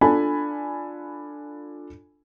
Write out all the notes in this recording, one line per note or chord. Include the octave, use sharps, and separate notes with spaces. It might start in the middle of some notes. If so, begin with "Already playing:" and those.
D4 F4 A4 G#5 B5